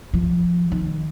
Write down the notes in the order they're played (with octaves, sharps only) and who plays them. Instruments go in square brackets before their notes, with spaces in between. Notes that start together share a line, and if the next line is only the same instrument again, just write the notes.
[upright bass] F3
D#3